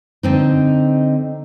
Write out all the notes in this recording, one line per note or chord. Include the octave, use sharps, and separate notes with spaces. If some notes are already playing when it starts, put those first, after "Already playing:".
D3 C4 D#4